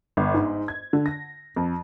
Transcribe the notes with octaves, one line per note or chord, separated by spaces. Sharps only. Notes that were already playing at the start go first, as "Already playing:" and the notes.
G1
G#2
G#6
D3
A#6
F2